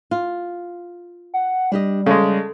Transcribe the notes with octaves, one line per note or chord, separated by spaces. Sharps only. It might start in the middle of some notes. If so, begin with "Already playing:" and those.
F4
F#5
G3 D4 G4 D#5
C#3 G#3 A4